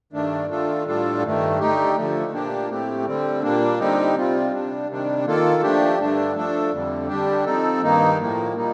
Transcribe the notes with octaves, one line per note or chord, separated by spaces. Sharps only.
G2 D#3 A3 D4
D#3 A3 D4 F4 A4
A2 G3 D4 F4 A4
G2 D#3 A3
D3 A3 D#4 G4
D3 F3 A3
A#2 F3 A#3 D4 G4
A2 A3 C4 G4
D3 G3 C4
A#2 G3 A#3 D4
D3 G3 C4 D#4 G4
C3 G3 C4 F4
C3 G3 D4
C3 D#3 G3 D4
D#3 A#3 F4 A4
F3 A3 D4 G4
G2 D3 A3 D4
F3 A3 D4 A4
F2 D3 G3
D3 G3 D4 G4
F3 C4 D#4 A4
G2 D#3 A#3 D#4
A2 F3 A#3
A#2 G3 A#3 D#4